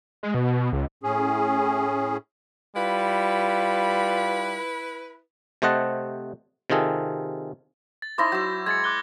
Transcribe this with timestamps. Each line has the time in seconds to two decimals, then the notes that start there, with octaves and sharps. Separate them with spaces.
0.23 G#3
0.34 B2
0.73 C#2
1.03 A2 C#4 G#4
2.76 G3 E4 F4 B4
5.62 C3 A3 C5 D#5 F#5 A5
6.70 C3 D#3 F4 G#4 A4
8.02 A6
8.18 D#4 E4 C5 D6 A#6
8.32 F#3 E6 G6
8.66 G#3 G#6 A6 C#7
8.84 D6 F#6 G7